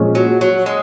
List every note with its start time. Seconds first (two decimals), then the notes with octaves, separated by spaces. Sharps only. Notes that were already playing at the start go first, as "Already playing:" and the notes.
Already playing: A#2 F3 G#3 C#4
0.15 F#3
0.41 F#3
0.66 G#3